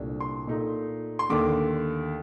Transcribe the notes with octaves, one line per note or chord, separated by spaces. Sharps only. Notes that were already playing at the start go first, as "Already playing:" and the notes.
Already playing: C2 A#2 A3 D4
C6
A#2 A3 D#4
C6
D#2 D3 A3 D4 D6